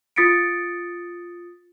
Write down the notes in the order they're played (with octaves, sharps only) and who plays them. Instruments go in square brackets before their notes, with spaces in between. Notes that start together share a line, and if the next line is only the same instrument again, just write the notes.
[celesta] F4 D#6 A6 B6 C#7 D7